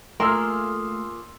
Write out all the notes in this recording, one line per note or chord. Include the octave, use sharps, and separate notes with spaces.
A3 A#3 F4 G#4 A#4 C6 E6 F6